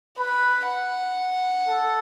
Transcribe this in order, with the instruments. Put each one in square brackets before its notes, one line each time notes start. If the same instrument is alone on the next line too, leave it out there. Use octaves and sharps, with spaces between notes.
[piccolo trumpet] B4 [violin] B5
[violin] F#5
[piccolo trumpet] A4